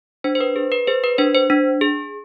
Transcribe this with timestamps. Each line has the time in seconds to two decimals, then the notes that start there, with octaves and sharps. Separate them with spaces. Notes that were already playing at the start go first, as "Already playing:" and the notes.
0.24 D4 C5
0.35 C5
0.40 B4
0.56 G#4
0.72 B4
0.87 G#4 C5
1.04 B4
1.18 D4 C5
1.35 C5
1.50 D4
1.81 G#4